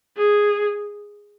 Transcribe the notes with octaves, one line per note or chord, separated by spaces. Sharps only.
G#4